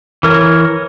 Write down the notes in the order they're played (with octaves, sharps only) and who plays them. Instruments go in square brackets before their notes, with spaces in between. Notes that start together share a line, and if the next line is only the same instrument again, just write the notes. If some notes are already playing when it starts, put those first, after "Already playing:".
[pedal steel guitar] E3 A#4 C#5